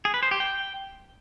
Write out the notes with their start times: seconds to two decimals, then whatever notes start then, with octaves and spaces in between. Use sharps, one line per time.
0.05 G#4
0.14 B4
0.23 C5
0.31 G4
0.40 G5